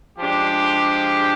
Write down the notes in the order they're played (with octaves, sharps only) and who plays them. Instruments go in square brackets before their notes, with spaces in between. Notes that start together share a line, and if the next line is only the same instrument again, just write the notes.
[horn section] F3 G#3 D4 G4